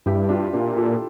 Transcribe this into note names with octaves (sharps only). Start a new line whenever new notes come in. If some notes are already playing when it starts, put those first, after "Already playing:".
G2 E4 G4
D4 F4
A#2 D4 F4
F4 A4